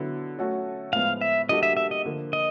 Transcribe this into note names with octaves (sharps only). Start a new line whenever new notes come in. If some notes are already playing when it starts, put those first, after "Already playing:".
Already playing: D3 F#3 B3 E4
F#3 A3 C#4 F#4 A4
A2 F3 G#3 B3 F5
E5
G3 A#3 D4 F#4 A4 D#5
E5
E5
D#5
D3 F3 A#3
D#5